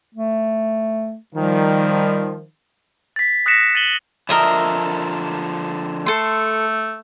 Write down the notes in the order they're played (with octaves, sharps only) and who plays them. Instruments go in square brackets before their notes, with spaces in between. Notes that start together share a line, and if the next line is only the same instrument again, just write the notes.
[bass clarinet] A3
[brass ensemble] D#3 F3 [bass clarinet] G3
[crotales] A6 B6
D#6 F#6 A#6 B6 C#7 E7
A6 D#7 E7 F#7 G7
[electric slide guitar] D3 F3 D4 [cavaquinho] A#4 D#5 E5
[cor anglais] A3 [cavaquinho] A4 C6